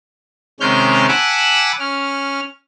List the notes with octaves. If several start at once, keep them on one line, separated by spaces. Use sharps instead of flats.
C3 D#3 G#3 C#4 F6 G6
F#5 G#5 A5 B5 D6 E6
C#4 F6